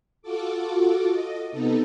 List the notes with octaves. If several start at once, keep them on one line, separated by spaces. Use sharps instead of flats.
F4 F#4 A4 D6
D#5
C3 B3 D#4 A4